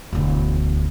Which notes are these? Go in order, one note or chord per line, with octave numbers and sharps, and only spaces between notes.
E1 D2